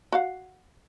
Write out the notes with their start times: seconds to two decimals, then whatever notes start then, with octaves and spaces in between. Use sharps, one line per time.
0.12 F#4 F5 F#5